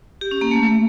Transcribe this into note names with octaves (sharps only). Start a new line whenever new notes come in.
G4
C#4
A#3
A3